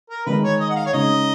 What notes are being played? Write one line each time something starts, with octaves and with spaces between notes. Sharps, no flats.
A#4
D#3 G#3 D#4 B4
C#5
D#5
F#5
F5
C#5
C#3 G#3 D#4 D#5